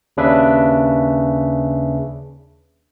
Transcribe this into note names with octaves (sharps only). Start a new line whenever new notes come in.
D#2 C#3 D4 B4 E5